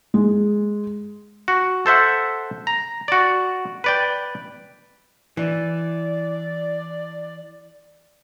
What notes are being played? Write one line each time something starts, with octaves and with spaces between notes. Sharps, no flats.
G#3
F#4
A4 C5 E5 F#5
A#5
F#4 D5
B4 D5 G5
E3 D5